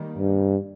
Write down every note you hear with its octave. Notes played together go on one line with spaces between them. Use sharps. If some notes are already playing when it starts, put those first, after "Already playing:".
Already playing: D#3 G3 A#3
G2